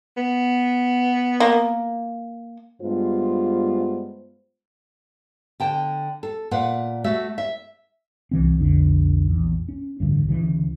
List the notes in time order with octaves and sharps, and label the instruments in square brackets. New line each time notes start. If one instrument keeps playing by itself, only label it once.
[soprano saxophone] B3
[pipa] A#3
[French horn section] G2 G#3 B3 F4 C5
[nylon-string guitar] D3 G5 A5
A4
A#2 B4 F5 F#5
A3 F#4 E5
E5
[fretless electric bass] C2 E3 C4
B1 F2 D3
A#1 E2
C#4
A1 D2 G2
D2 C#3 E3